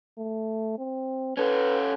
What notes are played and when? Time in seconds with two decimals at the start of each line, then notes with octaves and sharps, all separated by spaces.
0.18 A3
0.79 C4
1.37 C#4 A4 B4